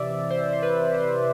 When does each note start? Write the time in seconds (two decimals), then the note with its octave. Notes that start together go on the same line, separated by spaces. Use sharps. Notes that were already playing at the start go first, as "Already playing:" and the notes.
Already playing: C3 E3 D5 E5
0.30 C5
0.53 C5
0.62 B4
0.94 C5